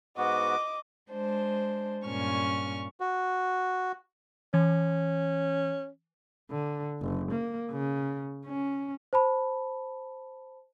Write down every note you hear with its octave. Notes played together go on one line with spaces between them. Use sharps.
G#2 B3 F#4 D#5 D6
G#3 D4 C5
G2 A#2 C#4 C#6 F6
F#4
E3 C#4
D3
F#1
A#3
C#3
C#4
C5 A5 B5